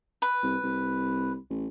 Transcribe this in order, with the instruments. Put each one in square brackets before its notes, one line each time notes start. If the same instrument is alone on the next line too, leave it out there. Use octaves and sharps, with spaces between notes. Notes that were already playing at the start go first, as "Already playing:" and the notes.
[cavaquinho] B4
[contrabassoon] C2
C2
A1